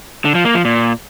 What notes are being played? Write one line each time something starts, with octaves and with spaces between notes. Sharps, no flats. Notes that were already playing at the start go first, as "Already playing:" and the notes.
D3
F3
A#3
F3
A#2